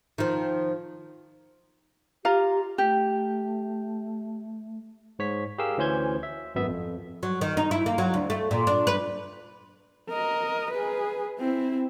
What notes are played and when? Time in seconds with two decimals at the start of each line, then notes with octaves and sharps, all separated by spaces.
0.18 D#3 F3
2.25 F4 G4 F5 A#5
2.78 A3 G4
5.19 G#2 C#5 B6
5.58 G4 G#4 A#4 F5 E6
5.78 D2 E3 C#4 C5 G6 G#6
6.23 E5
6.55 G#1 F#2 B3 E5
6.67 F2
7.23 F#3
7.41 D#3
7.57 D#4
7.71 E4
7.86 A#3
7.98 F#3
8.14 D2
8.30 A3
8.51 A#2
8.67 D4
8.87 B4
10.09 A#4 D#5
10.71 G#4 B4
11.39 C4 E4